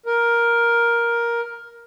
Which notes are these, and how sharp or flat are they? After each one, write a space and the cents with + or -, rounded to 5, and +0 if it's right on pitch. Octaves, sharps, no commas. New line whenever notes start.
A#4 +10